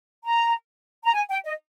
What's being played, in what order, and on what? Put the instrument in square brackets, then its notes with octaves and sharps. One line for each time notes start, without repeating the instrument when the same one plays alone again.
[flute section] A#5
A#5
G#5
G5
D#5